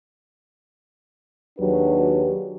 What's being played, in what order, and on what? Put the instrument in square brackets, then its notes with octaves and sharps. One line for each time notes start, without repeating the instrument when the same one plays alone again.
[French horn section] D#2 F#3 D4 G4 G#4 B4